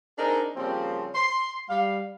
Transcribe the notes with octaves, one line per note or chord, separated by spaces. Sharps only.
C4 D4 D#4 G#4 A#4
C#3 F3 G3 A#3 C4
C6
G3 F5